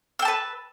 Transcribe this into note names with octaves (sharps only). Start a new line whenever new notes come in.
B4 G5 A5 E6